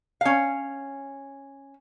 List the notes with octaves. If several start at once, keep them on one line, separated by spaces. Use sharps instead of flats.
C#4 F5